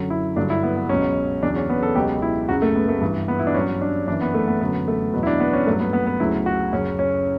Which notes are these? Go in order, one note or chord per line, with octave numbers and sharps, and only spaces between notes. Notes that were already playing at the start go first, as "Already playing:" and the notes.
Already playing: F#2 D3 F#3
E4
G2 D3 F#3 D4
E4
B3
B3
C#2 B2 F#3 C#4
E2 C#3 F#3 D4
C#4
B3
A4
C#2 B2 F#3 G4
E4
F#2 C#3 F#3 F#4
A3
B3
A3
G2 E3
B3
E4
D4
G2 F#3 C#4
D4
F#2 E3 D4
B3
A3
B3
F#2 D3 F#3 B3
A3
E2 B2 F#3 B3
E4
D4
B3
C#4
G2 F#3 A3
B3
B3
B3
D2 C#3 F#3 E4
F#4
F#2 C#3 F#3 C#4
C#4